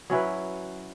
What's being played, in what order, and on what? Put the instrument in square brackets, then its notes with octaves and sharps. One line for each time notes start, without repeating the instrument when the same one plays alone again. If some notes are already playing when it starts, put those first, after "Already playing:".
[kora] F#3 C#4 E4 B4